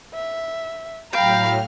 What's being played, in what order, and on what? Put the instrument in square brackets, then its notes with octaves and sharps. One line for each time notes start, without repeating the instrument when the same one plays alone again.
[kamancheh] E5
[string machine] A2 F#3 F6 [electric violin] F5 [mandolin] G5 [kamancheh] A#5 B5